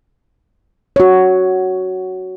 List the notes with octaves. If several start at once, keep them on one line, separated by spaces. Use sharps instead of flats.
F#4 C#5